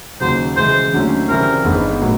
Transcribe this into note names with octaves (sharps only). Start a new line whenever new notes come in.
D#2 C#3 F#3 C5
C#3 E3 G#3 C5
D#2 D3 F#3 A3 C#4
C#3 E3 G3 C4 A#4
G1 G2 D#3 G#3 B3
A2 F#3